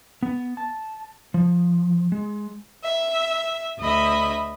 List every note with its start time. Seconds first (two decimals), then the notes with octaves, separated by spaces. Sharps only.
0.23 B3
0.57 A5
1.34 F3
2.12 G#3
2.83 E5
3.78 D2 D#5 E5 B5